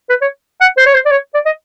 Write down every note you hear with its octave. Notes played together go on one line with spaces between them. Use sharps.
B4
C#5
F#5
C5
C#5
C5
D5
C#5
D5
D#5